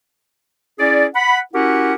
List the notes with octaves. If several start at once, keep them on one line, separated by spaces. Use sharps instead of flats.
C#4 E4 G#4 D5
F#5 B5
C#4 E4 F#4 G4 A#4 F#5